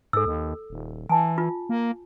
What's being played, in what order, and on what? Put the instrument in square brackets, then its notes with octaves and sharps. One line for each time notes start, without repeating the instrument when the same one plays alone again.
[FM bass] G#2 [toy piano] A4 E6
[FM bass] D#2
D#1
[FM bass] E3 [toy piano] G#5 A5
[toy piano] F4
[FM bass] A#3